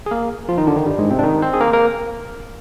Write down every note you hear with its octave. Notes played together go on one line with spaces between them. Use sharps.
G#4
A#3 A#4
F3 F4
D#3 D#4
D3 D4
D#3 D#4
G2 G3
G#2 G#3
C3 C4
D4
D#3 D#4
C4 C5
G#4
A#3 A#4
A#3 A#4